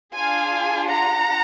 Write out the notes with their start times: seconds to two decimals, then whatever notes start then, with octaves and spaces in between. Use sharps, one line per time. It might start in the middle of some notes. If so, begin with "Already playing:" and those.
0.15 D4 F4 G#4 F5 G#5
0.88 F#5 A#5